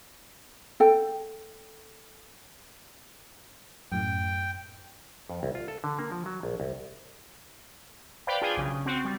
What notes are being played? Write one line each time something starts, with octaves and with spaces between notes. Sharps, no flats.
A4 G5
F#2 A2 G5
F2
C2
F4
A4
D3
A#3
F3
F#3
A#1
C2
B4 C5 D5 F5 G5 B5
D4 F4 G#4 G5 G#5
B1 C#3
C#3
C4 F#4
G3